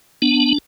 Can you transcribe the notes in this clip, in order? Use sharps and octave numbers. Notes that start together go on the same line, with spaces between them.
B3 D4